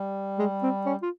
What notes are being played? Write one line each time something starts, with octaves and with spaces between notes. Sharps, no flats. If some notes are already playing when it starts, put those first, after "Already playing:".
Already playing: G3
G#3
C4
C#4
F4